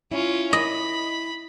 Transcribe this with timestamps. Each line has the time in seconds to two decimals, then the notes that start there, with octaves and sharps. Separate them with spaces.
0.12 C#4 E4 F4
0.53 D#5 B5